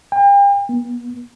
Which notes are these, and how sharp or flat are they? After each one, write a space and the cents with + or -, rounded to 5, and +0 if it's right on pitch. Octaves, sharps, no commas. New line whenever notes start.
G5 +40
B3 -40